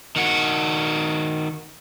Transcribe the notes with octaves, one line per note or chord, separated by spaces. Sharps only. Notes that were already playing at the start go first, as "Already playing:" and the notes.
D#3 F#4